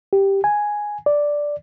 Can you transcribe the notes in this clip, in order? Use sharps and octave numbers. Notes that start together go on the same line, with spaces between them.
G4
G#5
D5